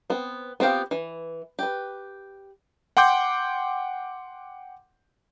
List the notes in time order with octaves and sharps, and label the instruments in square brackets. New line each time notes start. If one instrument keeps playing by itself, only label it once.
[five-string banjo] B3 C4
B3 C4 F4 G4 F5
E3
G4 B4
[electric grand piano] F#5 G5 C6 D6 G6